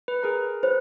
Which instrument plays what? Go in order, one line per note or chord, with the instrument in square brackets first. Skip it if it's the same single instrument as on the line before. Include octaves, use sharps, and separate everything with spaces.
[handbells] B4
G#4 A#4 A#5
[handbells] B4 [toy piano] C5